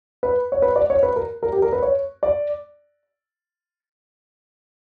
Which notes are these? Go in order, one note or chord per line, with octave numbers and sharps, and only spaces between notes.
B4
C#5
B4
D5
C#5
B4
A#4
A#4
G4
A#4
B4
C#5
D5